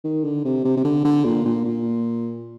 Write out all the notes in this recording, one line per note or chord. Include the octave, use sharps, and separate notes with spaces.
D#3
D3
C3
C3
C3
D3
D3
A#2
A#2
A#2